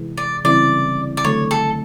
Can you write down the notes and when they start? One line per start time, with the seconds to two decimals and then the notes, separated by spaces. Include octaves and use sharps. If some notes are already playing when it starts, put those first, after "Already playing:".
Already playing: C3 E3 G#3
0.17 D5
0.44 C#3 E3 G3 C4 E4 D5
1.17 D5
1.25 D3 F#3 A3 C#5
1.51 A4